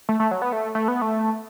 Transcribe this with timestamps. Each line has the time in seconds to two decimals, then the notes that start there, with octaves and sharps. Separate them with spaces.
0.09 A3
0.20 A3
0.31 F#3
0.42 B3
0.53 A3
0.75 A3
0.88 B3
1.02 A3